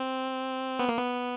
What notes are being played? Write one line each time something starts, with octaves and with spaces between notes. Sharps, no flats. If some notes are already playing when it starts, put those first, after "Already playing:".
Already playing: C4
B3
A#3
B3